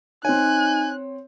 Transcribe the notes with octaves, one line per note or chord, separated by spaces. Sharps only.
C4 D#4 C#5 G#5 F#6